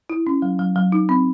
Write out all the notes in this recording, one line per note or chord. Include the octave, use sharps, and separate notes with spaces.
E4
C#4
F#3
F#3
F#3
D#4
C4